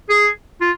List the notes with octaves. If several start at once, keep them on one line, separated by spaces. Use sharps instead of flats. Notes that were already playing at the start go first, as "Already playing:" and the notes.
G#4
F4